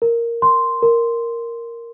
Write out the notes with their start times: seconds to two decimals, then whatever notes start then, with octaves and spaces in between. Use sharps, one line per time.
0.02 A#4
0.42 C6
0.83 A#4